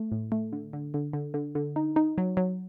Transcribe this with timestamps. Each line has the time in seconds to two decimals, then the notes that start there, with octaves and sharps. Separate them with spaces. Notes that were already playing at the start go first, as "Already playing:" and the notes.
Already playing: A3
0.12 A2
0.32 A3
0.52 D3
0.73 D3
0.94 D3
1.13 D3
1.34 D3
1.55 D3
1.76 D#4
1.96 D#4
2.18 F#3
2.37 F#3